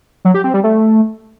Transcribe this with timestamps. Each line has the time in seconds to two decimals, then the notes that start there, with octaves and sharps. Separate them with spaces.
0.25 F#3
0.34 G4
0.44 C4
0.54 G3
0.64 A3